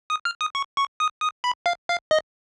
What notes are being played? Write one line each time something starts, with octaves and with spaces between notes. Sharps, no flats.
D#6
F6
D#6
C#6
C#6
D#6
D#6
B5
F5
F5
D#5